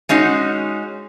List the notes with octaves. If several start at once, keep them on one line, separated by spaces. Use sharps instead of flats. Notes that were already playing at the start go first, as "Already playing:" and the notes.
G#3 C#4 D#4 F#4